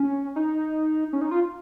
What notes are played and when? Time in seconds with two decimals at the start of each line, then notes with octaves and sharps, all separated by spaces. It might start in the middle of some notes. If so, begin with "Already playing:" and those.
Already playing: C#4
0.36 D#4
1.13 C#4
1.21 D#4
1.31 F4